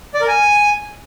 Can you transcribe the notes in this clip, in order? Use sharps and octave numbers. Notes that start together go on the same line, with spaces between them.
D5
A#4
G#5